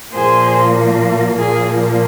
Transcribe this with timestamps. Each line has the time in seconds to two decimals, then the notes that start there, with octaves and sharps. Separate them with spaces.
0.13 A#2 F3 A#3 G#4 C5
1.37 A#2 F3 A#3 G#4